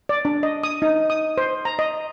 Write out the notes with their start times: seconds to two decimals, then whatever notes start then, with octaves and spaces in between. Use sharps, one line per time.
0.09 D5
0.25 D4
0.43 D#5
0.63 D#6
0.82 D#4
1.10 D#6
1.38 C5
1.65 A#5
1.79 D#5